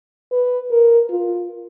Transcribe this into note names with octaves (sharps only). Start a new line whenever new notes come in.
B4
A#4
F4